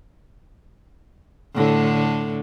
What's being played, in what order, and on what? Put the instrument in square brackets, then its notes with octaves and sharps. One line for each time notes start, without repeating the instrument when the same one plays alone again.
[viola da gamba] A2 D3